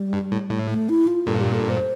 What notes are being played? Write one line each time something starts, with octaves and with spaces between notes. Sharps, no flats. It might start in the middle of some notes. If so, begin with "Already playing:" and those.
Already playing: G3
G2
A2
A2
A3
E4
F4
G2 A#2 A4
G4
A4
C5